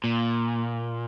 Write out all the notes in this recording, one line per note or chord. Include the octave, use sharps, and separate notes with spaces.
A#2